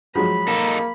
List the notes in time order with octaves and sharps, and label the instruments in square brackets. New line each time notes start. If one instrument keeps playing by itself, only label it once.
[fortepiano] F3 F#3 G#3 [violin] B5
[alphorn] A#3 [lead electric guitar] D#4 A4